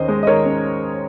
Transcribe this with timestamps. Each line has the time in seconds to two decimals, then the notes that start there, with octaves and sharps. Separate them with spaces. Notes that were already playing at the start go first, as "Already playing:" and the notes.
Already playing: D#2 C#4 C5 D#5
0.08 G#3
0.23 D#5
0.27 D#3 A#4 C#5
0.45 C#4